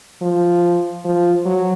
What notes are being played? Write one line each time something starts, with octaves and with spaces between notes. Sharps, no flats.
F3
F3
F#3